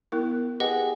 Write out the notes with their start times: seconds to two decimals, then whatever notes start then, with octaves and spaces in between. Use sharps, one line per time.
0.12 B3 E4 A#4
0.60 G4 G#4 B4 D#5 F#5